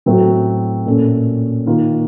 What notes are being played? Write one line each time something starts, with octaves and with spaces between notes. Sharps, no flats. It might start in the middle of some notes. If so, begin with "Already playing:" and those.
A2 F#3 A3 C4 F#4
A#2 A3 C#4 A4
D#3 A#3 F4 A#4